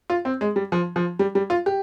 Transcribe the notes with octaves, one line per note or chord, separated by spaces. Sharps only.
F4
C4
G#3
G3
F3
F3
G3
G3
F4
G4